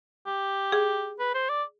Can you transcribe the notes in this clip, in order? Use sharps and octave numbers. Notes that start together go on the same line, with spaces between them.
G4
G#4
B4
C5
D5